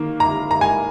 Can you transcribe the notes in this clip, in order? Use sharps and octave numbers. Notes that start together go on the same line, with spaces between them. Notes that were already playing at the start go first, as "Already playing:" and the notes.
Already playing: D#3 A#3
A#5
A#5
G#5